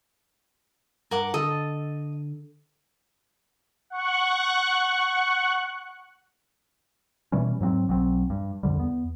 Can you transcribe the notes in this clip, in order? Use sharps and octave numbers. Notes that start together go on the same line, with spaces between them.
G2 A#4 F#5 D6
D3 A4 D#5
F#5 C#6 F#6
B2 E3 G3 C#4
G#2 F#3 B3 C4
B1 F#3 G3 C4
G2
F2 D3 G3
E2 B3